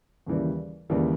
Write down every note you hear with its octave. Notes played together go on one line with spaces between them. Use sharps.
D#2 C#3 E3 G3
D#2 C#3 E3 G3